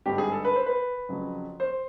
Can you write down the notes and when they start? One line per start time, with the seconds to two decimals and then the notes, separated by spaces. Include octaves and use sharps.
0.06 G#1 G2 D3 G4
0.18 G#4
0.32 A4
0.45 B4
0.56 C5
0.66 B4
1.09 F2 C#3 F#3
1.60 C5